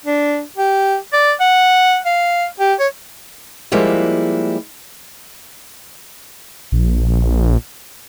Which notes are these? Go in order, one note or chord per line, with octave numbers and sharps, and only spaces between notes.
D4
G4
D5
F#5
F5
G4
C#5
F3 G3 G#3 A#3 E4
A#1